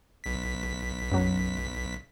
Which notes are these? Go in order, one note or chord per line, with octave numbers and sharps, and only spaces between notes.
B1 B6
F#2 F#3